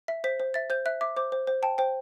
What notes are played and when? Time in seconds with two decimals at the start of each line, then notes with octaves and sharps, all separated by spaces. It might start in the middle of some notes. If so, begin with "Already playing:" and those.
0.08 E5
0.24 C5 B6
0.40 C5
0.54 E5 A6
0.70 C5 G6
0.86 E5 F#6
1.01 E5 D6
1.17 C5 D6
1.32 C5
1.47 C5
1.63 G5 A5
1.78 C5 G5